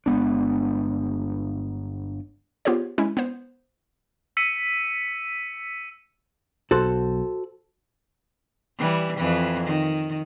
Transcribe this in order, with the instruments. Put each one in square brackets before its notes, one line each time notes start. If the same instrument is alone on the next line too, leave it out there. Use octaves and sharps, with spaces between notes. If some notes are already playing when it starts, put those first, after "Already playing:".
[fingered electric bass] G1 G#3 B3 D4
[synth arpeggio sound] B3 F4 G4 G#4 C5 C#5
G#3 C#4 E4
B3 C5
[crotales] E6 B6 C#7 D#7
[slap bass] B1 [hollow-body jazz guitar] F#4 A4 C5
[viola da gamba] E3 G3
F2 E3
D#3